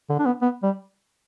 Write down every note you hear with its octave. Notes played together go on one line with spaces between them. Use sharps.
D3
D4
B3
B3
G3